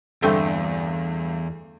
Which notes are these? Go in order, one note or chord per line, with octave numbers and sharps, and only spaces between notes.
E2 G2 D3 A3 C4